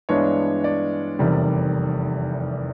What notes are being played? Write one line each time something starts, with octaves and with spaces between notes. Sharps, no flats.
G2 E3 G#3 B3 D4 C#5
D5
F1 E2 C3 D#3 G3